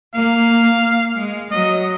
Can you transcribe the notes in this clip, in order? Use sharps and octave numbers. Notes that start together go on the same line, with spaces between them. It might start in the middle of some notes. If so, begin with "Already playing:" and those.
A#3 F5
G#3
F#3 D#5